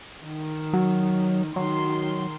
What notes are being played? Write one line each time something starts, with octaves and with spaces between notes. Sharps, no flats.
D#3
F#3
D#3 F#3 C6